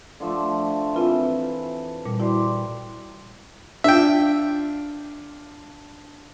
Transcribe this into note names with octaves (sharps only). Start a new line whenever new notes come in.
D3 F3 A3
E3 C4 F4 A#4
A#2 G3
E4 F#4 G4 C5 D5
D4 F4 E5 G5